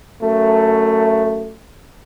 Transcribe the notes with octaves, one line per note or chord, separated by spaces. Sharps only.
F#2 A3